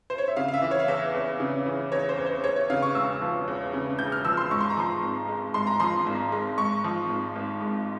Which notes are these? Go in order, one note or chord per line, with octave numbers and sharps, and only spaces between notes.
C5
C#5
E5
C#3 F5
F5
E5
E3
C#5
F5
E2 E5
E2
C#3
E3
E2 C#5
C5
E2
C5
E2 C#5
C#5
C#3 F5
C#6
E1 E6
F3
E2
C#3
E1 G6
F6
F3 E6
C6
G#2 C#6
C6
A#5
F3 C6
G#1
G#3
G#2 C6
A#5
F3 C6
G#1
G#3
G#2 C#6
F3
G#1
G#1
G#2